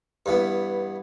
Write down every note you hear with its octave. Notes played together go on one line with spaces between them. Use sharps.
G2 E3 B3